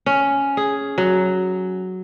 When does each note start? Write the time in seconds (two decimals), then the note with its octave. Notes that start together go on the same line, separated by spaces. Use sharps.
0.06 C#4
0.57 G#4
0.98 F#3